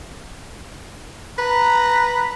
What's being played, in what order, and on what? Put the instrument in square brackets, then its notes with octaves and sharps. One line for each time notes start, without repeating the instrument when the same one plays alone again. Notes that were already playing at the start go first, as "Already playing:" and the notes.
[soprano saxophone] B4 [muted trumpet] A#5